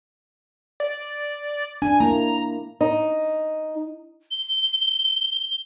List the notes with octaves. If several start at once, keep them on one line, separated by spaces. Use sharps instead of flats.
D5
D4 G#5
A#3 E4 A#5
D#4
G7